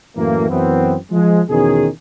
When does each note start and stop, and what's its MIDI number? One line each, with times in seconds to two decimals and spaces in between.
0.17 0.45 42
0.17 0.45 45
0.17 0.45 52
0.17 0.45 54
0.17 0.45 57
0.17 0.45 58
0.49 0.96 42
0.49 0.96 52
0.49 0.96 59
0.49 0.96 60
1.11 1.41 53
1.11 1.41 56
1.49 1.88 40
1.49 1.88 47
1.49 1.88 51
1.49 1.88 61
1.49 1.88 68